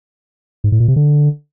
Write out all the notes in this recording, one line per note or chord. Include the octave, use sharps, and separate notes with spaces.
G#2
A2
A#2
C3
D3